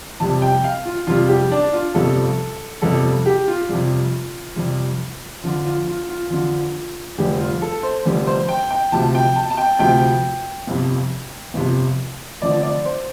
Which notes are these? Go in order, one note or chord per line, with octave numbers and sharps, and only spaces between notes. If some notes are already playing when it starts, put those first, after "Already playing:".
F2 C3 G3 A5
G5
F5
F4
F2 C3 G3 F4
G4
D4
F4
G1 F2 C3 G3 A4
G1 F2 C3 G3 A4
G4
F4
F2 C3 G3
F2 C3 G3
F2 D3 F3 F4
F4
F4
F4
F2 D3 F3 F4
F1 F2 D3 G3 G4
F4
A4
C5
F1 F2 D3 G3
C5
G5
G5
D2 C3 F3 A5
G5
A5
A5
G5
D2 C3 F3 G5
G1 F2 C3 F3
G1 F2 C3 F3
F1 F2 D3 F3 D5
D5
C5